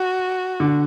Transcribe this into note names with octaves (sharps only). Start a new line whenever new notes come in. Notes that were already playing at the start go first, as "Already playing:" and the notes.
Already playing: F#4
D3